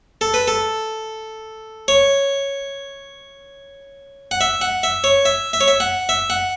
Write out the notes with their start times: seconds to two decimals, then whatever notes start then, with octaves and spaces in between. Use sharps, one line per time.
0.21 A4
0.34 B4
0.48 A4
1.88 C#5
4.31 F#5
4.41 E5
4.61 F#5
4.83 E5
5.04 C#5
5.25 E5
5.53 E5
5.61 C#5
5.68 E5
5.80 F#5
6.09 E5
6.30 F#5